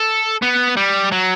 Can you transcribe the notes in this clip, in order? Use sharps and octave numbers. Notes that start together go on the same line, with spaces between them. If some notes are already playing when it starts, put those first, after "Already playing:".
Already playing: A4
B3
G3
F#3